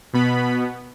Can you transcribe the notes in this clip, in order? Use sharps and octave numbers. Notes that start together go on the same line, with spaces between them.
B2 B3 B5